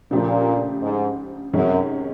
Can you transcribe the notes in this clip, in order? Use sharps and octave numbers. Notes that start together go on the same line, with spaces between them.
A#2 C#3 F3 A3 D4 G4
G#2
F#2 C3 D#3 G#3 C#4